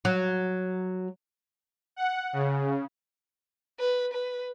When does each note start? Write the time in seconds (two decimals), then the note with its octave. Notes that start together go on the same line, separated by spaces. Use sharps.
0.05 F#3
1.96 F#5
2.33 C#3
3.79 B4
4.13 B4